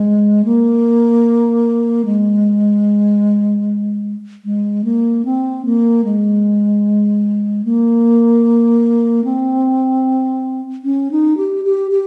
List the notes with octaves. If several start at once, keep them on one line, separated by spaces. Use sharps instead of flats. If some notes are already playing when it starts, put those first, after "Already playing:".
Already playing: G#3
A#3
G#3
G#3
A#3
C4
A#3
G#3
A#3
C4
C#4
D#4
G4
G4
G4